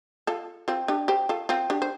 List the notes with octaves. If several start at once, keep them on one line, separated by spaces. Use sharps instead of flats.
F4 A4
C4 F4
D4 G4
G4 C5
F4 A4
C4 F4
D4 G4
C5